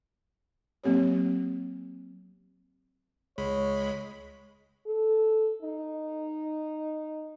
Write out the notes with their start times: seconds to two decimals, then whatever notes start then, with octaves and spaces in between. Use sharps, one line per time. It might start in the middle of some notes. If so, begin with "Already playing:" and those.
0.84 F#3 A#3 C4 G4 C#5
3.38 C#2 G#3 C#5 B5
4.87 A4
5.62 D#4